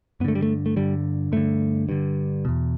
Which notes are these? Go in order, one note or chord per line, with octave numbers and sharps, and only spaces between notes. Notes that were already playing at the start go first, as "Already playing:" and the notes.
G2 D3 A3 B3
G3
A3
A3
G2 D3 G3
G2 D3 A3
G2 D3
E2 B2